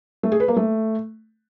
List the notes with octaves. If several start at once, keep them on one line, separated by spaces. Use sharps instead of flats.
A3
G#4
B4
A#3
A3